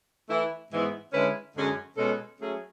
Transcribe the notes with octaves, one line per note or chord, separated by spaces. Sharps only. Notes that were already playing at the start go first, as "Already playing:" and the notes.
E3 A3 E4
G#2 E3 G#3 B3 E4
D3 G#3 C#4 E4 B4
F#2 D3 G#3 C#4 G#4
B2 G#3 C#4 F#4 A4
F#3 A3 C#4 G#4